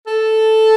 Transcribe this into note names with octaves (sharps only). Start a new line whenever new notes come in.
A4